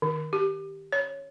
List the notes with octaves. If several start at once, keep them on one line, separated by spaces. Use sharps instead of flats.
D#3
G4
C#5